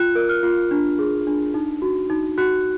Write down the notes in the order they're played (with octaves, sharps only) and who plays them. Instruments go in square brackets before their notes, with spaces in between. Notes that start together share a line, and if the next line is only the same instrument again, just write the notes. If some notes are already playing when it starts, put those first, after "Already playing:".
Already playing: [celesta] F4 F#6
A#4
F6
F4
D4
G#4
D4
D#4
F#4
D#4
F#4 F#6